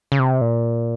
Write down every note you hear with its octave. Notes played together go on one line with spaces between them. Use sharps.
C#3
C3
A#2